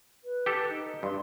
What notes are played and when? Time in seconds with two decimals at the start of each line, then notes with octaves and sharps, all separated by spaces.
0.24 B4
0.46 G4 A4
0.69 D#4
1.03 G2 C6